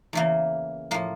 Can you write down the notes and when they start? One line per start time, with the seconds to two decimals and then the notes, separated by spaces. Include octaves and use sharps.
0.13 E2 C#3 E3 A#3
0.91 A2 F3 A#3